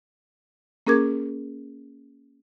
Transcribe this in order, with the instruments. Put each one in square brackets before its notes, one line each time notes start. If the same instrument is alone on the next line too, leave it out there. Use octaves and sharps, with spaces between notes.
[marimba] A#3 C#4 G#4 A#4 D6 G#6